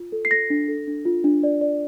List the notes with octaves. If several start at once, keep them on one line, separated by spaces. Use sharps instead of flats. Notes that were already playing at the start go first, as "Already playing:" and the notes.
Already playing: F4
A4
C7
A4 A#6
D4
A4
D4
F4
D4
D5
D5